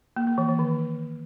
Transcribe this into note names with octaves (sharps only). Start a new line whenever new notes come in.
A#3
A#3
E3
E3
D#3